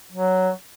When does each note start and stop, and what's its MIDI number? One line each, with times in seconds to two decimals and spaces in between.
0.12 0.50 54